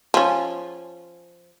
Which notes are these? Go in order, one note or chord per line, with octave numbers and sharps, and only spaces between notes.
F3 C#4